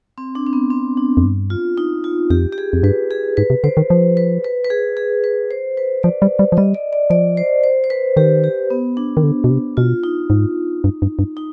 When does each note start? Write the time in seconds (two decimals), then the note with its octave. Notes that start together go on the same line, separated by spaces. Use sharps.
0.18 C4
0.35 D4
0.47 C4
0.53 B3
0.70 C4
0.97 D4
1.17 F2
1.24 G2
1.50 F4
1.78 D#4
2.04 F4
2.30 F2 G4
2.53 G4
2.58 G#4
2.73 F2
2.83 G2 B4
3.11 G#4
3.37 G#2 B4
3.50 C3
3.64 D3 C5
3.77 D#3
3.90 F3
4.17 B4
4.44 B4
4.65 B4
4.70 G#4
4.97 G#4
5.24 B4
5.51 C5
5.77 B4
6.03 F3 D5
6.22 G3
6.39 G3
6.52 F3
6.57 G3 D#5
6.74 D5
6.93 D5
7.10 F3 D5
7.37 C5
7.64 C5
7.84 C5
7.90 B4
8.17 D#3 G4
8.44 G4
8.70 B3
8.97 D4
9.17 D#3
9.23 D3
9.44 B2
9.50 C3
9.77 B2 F4
10.04 D#4
10.30 G#2
10.84 G2
11.02 G2
11.19 G2
11.37 D#4